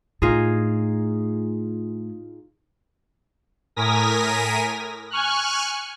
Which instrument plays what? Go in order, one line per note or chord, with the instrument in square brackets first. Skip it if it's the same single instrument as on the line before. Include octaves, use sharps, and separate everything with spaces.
[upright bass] A2 [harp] D#4 F4 G#4
[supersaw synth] A2 A#4 G#5 D#6 A#6 B6
G#5 C#6 F6 F#6